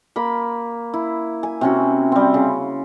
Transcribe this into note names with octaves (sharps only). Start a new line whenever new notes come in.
A#3 B5
E4
G#5
C3 C#4 F#4
G3 C4
C#3